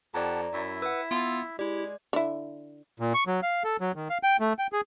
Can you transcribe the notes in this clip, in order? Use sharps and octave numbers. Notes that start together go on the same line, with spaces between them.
F2 G4 D5 F#5 A5 A#5
F#2 E4 E5
B4 F#5 E6
B3 F4
G#3 E4 G4 D5
D3 E4
A#2
C#6
F#3
F5
A4
F#3
D#3
F5
G5
A3
G5
G#4